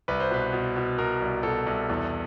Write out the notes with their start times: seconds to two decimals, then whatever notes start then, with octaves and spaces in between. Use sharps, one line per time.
0.08 C2 B4
0.20 C5
0.31 B2 B4
0.53 B2
0.76 B2
0.98 B2 A#4
1.22 C2
1.43 B2 A4
1.66 C2
1.89 E2